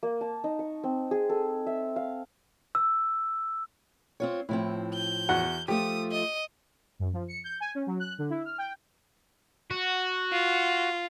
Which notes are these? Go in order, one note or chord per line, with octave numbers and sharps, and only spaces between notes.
A#3
A5
D#4
C#6
C4
G#4
A4
E5
F5
E6
C4 F4 C#5
A2 F3 C4 E4
G6
E2 F#4 F#5
F3 A3 F4 G4 D#6
D#5
F#2
F3
C#7
G6
G#5
C#4
F#3
F#6
D3
E4
F6
G5
F#4
F4